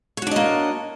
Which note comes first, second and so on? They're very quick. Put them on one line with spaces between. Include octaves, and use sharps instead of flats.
C#5 F#4 D4 D#5 A#3